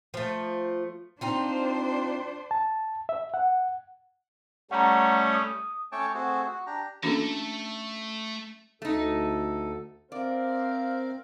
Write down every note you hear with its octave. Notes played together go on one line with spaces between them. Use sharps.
F3 A3
C4 D4 D#4 F4 C5
A5
E5
F#5
G3 A3 C#4 F#5 A#5
D#6
A3 C#4 C#5 G5 A5 D6
A3 C4 F#4 G#4
F#4
D4 G4 A#5
E3 A3 A#3 C#4 D4 F#4 A4 A5
D2 A3 D#4 A4
C4 A#4 C5 D5 E5 F5